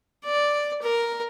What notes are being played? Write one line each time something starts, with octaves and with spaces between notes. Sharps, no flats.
D5
A#4